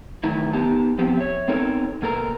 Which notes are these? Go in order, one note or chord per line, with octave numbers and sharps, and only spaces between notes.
E2 A2 D#3 F#3 D#4 E4
B3 D#4 G4 A5
F3 B3 C4 G4
C#5 E5
B3 C4 D#4 A4 A#4 C#5
B2 A#3 A4 A#4 A#5